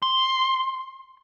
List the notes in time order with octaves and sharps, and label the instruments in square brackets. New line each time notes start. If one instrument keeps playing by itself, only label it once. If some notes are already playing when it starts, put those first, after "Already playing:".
[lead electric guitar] C6